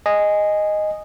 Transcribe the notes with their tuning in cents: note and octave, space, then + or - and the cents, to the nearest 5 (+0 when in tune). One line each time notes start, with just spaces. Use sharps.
D#5 -5 G#5 -10